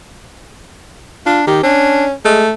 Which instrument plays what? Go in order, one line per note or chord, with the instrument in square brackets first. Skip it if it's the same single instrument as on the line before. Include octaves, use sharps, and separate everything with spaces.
[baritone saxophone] D4 [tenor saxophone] F4
[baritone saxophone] D#3 [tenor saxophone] G4
[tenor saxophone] C#4 [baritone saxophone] D4
[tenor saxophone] G#3 [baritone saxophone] A3